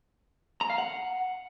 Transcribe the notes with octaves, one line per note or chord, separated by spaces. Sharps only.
A#5
F5
F#5